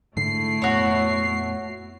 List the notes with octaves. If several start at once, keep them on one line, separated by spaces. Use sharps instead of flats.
G#2 D3 A3 E4 C7
F2 A#2 B3 F#4 C#5